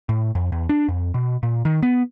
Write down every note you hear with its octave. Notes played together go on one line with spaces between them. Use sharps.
A2
F2
E2
D4
F2
B2
A#2
D#3
B3